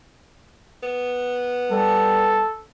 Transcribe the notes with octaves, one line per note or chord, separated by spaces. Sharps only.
B3
G3 A4